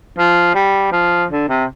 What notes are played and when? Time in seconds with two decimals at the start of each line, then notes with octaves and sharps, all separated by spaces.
0.18 F3
0.55 G3
0.92 F3
1.30 D3
1.49 C3